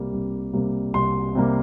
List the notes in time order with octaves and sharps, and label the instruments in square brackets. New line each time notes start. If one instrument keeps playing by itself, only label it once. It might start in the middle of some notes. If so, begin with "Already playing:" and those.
Already playing: [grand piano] C2 C3 G3 A#3
C2
C3 G3 A#3
C2 C6
C3 G3 A#3